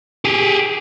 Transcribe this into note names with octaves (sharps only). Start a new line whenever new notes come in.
G4 G#4